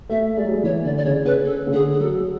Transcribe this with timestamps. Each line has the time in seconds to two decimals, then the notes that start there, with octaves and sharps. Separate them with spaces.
0.10 A3 E5
0.36 G#3 D5
0.45 F#3
0.52 G#3
0.64 E3 C#5
0.85 D3 D5
0.98 D5
1.05 C#3 C#5
1.25 C#3 B4
1.45 A4
1.67 C#3
1.73 D3 G#4
1.92 G#4
2.00 F#3 A4